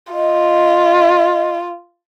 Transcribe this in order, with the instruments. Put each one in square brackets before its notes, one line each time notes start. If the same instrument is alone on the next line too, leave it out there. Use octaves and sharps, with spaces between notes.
[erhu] F4 [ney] D#5